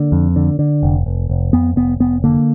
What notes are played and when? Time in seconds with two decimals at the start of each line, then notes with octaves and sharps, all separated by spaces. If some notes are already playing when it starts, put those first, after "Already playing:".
Already playing: D3 A#3
0.12 F2
0.36 D3
0.59 D3
0.83 F1
1.06 F1
1.29 F1
1.53 F2 B3
1.76 F1 B3
2.00 F1 B3
2.24 D3 A#3